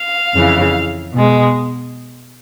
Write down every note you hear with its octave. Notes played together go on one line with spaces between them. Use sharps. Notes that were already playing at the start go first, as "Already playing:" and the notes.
Already playing: F5
F2 C#3 E3
B2 G#3